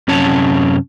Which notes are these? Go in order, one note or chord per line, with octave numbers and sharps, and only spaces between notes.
F#2 C3 C#4 C#5 A5